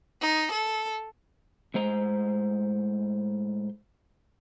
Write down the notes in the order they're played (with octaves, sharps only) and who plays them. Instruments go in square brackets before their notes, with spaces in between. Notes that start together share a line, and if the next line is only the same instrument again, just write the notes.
[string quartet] D#4
A4
[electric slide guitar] A2 G#3 C5 A#5